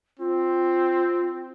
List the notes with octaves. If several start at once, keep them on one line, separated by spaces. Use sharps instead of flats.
C4 F4